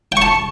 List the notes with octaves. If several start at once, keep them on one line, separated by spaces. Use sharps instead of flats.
G5 A5 C#6